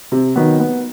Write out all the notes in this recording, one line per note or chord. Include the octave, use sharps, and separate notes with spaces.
C3
D#3 F#3 B3
B3